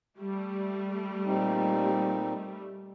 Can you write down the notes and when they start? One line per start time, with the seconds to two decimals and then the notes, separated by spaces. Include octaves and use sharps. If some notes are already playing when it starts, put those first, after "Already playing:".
0.18 G3 A3
1.26 A#2 C4 D#4